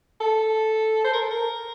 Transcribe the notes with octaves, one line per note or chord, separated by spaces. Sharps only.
A4
C5
A#4
A4
A#4